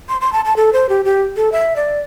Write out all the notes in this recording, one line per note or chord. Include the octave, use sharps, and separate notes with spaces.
C6
C6
A5
A5
A4
C5
G4
G4
A4
E5
D5